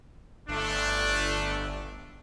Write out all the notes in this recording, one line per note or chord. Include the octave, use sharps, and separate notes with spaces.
G1 A3 D4